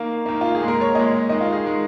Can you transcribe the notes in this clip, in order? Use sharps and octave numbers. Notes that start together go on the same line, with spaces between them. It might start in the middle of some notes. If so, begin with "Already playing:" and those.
Already playing: D#3 A#3 F5
D#3 A#3
F4
G#4
A#2 G#3
A#4
C#5
A#2 G#3 D#5
D#3 G#3 D#5
F4
G#4
D#3 G#3